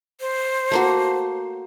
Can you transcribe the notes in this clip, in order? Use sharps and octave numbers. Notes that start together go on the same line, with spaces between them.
C5
A3 A#3 F#4